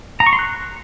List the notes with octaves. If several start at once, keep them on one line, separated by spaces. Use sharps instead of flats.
A#5
C#6
C6
F#6